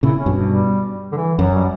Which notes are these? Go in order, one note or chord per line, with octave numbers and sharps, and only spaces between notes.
A#2 C#3 E4
C#4
G2 B2
G3
D3
E3
F#2 F#3
G3